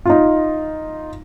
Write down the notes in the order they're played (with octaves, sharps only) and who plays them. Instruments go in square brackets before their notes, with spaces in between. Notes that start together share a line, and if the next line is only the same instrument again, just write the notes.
[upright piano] D#4 F4